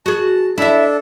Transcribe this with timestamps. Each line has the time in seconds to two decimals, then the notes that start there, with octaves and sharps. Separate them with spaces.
0.06 F#4 G#4 A5
0.58 D4 E4 A4 E5